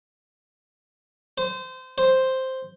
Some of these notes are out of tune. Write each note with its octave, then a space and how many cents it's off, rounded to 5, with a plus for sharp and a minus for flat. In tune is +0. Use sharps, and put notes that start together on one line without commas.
C5 -25
C5 +0